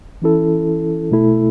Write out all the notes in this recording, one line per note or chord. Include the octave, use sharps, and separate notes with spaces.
E3 C#4 E4 A4
B2 A3 E4 A4